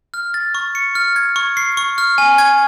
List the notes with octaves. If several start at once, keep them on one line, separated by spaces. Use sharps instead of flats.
F6
A6
C#6
C#7
F6
G#6
C#6
C7
C#6
F6
G#5
G#6